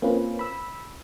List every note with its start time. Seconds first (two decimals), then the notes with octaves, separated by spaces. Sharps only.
0.02 A#3 C4 C#4 F4 B4
0.39 B5 E6